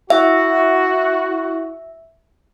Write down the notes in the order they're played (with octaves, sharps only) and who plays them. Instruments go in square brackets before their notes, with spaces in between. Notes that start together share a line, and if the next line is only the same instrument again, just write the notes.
[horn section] E4 F#4 [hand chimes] E5